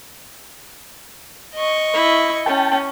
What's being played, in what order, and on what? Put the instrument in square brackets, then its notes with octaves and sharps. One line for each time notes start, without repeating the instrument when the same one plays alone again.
[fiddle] D#5 C#6
[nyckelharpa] E4
[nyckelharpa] C#4 [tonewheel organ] G5 A5